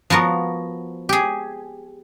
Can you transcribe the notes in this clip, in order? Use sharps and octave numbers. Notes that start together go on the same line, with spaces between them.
F3 B3 F#4 A#4
G4 G#4